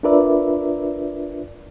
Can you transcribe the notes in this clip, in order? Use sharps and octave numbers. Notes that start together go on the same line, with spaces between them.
D4 F4 A#4 B4 D5 E5